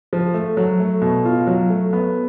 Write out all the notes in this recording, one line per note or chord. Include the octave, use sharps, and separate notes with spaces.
F3
A3
F#3
A3
B2
F4
F#3
A3
B3